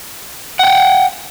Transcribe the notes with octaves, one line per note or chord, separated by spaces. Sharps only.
F#5 G5